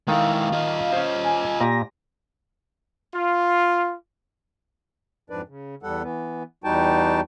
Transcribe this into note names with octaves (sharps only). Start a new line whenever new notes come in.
D#3 G#3 E4 A4 D5 F5
F4 D#5
C#4 F4 C5 D#5
G#5
A#2 G4 G#5 A#6
F4
F2 G#2 F3 D4 B4 D5
C#3
E2 G3 A4 F#5
E3 B3
E2 G3 D#4 F#4 G5 A5